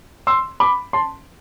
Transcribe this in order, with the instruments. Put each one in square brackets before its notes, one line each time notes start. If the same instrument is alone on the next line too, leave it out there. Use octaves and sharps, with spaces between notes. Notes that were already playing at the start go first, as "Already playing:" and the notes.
[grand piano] C6 E6
B5 D6
A5 C6